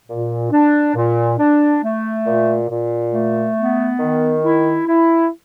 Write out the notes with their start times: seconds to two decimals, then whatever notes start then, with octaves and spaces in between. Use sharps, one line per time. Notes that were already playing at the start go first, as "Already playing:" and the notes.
0.07 A#2
0.51 D4
0.95 A#2
1.39 D4
1.82 A3
2.26 A#2
2.69 A#2
3.13 A3
3.57 B3
4.00 D#3
4.44 E4
4.87 E4